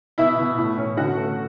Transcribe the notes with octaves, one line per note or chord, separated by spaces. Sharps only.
B2 E4 E5
B2
A2
C#4
D3 F#4 F#5
A3